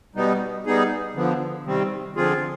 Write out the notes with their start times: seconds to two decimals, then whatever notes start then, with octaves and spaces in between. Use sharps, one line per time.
0.15 B2 G3 B3 D#4
0.66 G3 B3 D#4 G#4
1.15 D3 F3 B3
1.65 C3 D#3 G3 C4
2.16 D3 F3 C4 F4 G#4